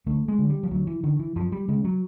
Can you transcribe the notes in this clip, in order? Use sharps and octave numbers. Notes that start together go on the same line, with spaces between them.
D2 A3
G#3
D3
G3
F3
D2 F#3
E3
D3 D#3
E3
F#2 F3
G3
C#3 G#3
F#3